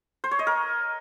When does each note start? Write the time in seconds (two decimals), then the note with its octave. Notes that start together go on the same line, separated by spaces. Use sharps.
0.24 C5
0.31 C#5
0.39 D#5
0.47 A#4